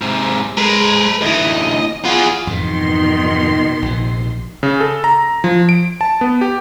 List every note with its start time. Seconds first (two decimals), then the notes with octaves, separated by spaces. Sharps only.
0.01 G#2 C3
0.58 G#3 A#4 B4
1.22 D2 E3 D#5
2.05 B3 F4 G#4
2.47 F2 G#2 B2 D#3 E3 C6
3.82 A#1 C3
4.63 C#3
4.80 A4
5.04 A#5
5.44 F3
5.69 D7
6.01 A5
6.21 B3
6.41 G4